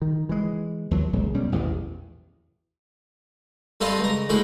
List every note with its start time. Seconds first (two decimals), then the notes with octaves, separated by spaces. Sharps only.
0.02 D#3
0.29 E3 G#3
0.91 D#2 F3 F#3
1.13 D#1 B1 C#3 G#3
1.34 D2 B2 G3 C#4
1.52 A1 E2 B2 D#3
3.81 G2 C4 A4 B4 D#5 F5
3.99 C#2 A#5
4.29 D2 A2 G#3 C5 B5